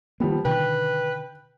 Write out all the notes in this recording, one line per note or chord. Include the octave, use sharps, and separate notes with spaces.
D#3 F3 G3 A#3 B3
B2 D3 D#3 B4 G5